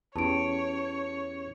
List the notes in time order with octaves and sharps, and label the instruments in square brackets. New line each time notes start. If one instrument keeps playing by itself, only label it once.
[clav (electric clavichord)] E2 [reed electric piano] C#4 G4 [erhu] C#5 [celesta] A5 D7